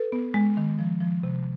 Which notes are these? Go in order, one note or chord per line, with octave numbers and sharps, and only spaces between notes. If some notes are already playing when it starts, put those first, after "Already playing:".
Already playing: A4 B4
B3
G#3
D#3
F3
F3
C3